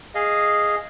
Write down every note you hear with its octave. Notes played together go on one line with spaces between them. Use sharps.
G#4 D#5 F5